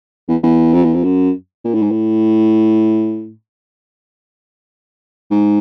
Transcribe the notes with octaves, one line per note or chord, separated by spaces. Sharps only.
E2
E2
F2
E2
F2
F#2
A#2
A2
G#2
A2
G#2